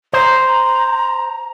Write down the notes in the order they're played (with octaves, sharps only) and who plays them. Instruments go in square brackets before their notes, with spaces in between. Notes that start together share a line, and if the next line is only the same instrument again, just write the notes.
[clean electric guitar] C5 [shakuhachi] A#5